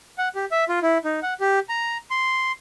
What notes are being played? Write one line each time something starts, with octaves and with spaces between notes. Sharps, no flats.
F#5
G4
E5
F4
E4
D#4
F#5
G4
A#5
C6